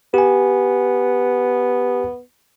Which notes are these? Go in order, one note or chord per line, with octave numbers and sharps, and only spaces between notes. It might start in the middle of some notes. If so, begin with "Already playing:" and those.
B3 G4 G#5